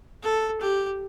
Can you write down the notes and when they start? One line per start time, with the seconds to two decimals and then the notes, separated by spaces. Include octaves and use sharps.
0.23 A4
0.61 G4